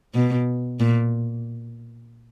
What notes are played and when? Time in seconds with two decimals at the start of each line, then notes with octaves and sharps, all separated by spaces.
0.14 B2
0.80 A#2